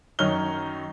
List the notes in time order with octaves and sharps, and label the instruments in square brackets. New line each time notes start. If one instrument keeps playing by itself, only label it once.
[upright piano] F#2 D#3 D#4 C#5 F6 G7